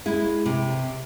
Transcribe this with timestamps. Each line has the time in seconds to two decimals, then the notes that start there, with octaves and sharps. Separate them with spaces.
0.06 G#3 E4
0.45 C3